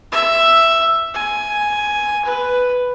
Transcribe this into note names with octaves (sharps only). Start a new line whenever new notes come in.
E5
G#5
B4